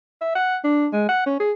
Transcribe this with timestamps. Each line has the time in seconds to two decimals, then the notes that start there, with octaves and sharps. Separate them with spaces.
0.21 E5
0.35 F#5
0.64 D4
0.93 G#3
1.09 F#5
1.26 C#4
1.40 G#4